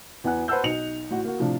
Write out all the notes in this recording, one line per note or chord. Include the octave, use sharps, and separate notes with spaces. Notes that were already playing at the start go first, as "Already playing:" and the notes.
E2 B3 F#5 G#5 F#6
B4 C5 F#5 A5 E6 G6
B1 D#4 C#7 F7
A1 F#4
A#3 F#4
A2 C3 F3 D4